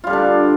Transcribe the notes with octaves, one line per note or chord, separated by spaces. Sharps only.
D3 G3 D4 F4